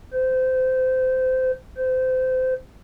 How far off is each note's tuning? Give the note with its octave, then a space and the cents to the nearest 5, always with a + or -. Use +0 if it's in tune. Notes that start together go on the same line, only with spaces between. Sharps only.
C5 -20
C5 -25